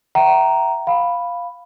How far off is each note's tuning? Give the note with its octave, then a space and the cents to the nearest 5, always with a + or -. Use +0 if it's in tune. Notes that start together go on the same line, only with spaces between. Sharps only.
E5 +20 G5 -45 A#5 +0
F5 +0 B5 +0